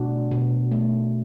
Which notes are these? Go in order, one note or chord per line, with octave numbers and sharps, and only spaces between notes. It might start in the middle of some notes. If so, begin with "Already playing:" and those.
Already playing: B2 A3 D4 F#4
B2
A3